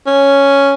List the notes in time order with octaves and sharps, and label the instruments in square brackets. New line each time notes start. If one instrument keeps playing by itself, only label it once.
[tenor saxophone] C#4